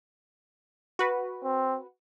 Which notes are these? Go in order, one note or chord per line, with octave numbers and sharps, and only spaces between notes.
F#4 B4
C4